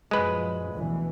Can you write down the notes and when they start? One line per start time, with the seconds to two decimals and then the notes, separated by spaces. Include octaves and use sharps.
0.11 F#2 A#2 F3 G#3 B4
0.71 D2 B2 E3